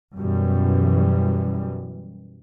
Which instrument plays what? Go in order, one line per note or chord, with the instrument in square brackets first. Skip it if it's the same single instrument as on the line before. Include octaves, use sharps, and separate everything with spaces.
[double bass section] F#2 B2 E3 G3